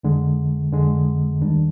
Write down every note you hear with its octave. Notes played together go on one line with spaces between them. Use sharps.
F2 D3 G#3
F2 D3 G#3
D#2 D#3 G3 D4